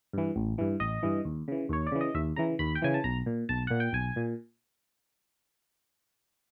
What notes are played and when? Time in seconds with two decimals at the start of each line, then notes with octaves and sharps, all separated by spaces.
0.13 G2 E3
0.36 A1
0.58 G2 E3
0.80 A1 D#5
1.03 G2 E3
1.25 D#2
1.48 C#3 E3
1.69 D#2 C#5
1.87 D5
1.92 C#3 E3
2.01 D#5
2.14 D#2 E5
2.36 C#3 E3 A#5
2.59 D#2 B5
2.75 G5
2.82 C#3 E3 G#5
2.94 A5
3.04 B1 A#5
3.26 A#2
3.49 B1 A5
3.67 A#2 F#5
3.80 G5
3.93 B1 G#5
4.16 A#2